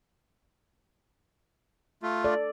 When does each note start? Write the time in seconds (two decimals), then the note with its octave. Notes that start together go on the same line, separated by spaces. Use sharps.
2.03 A3 F4
2.25 A4 D5